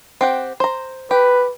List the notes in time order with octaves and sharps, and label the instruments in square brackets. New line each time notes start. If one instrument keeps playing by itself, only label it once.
[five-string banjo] C4 G4 F#5
C5 A#5
[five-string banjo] G4 [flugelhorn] B4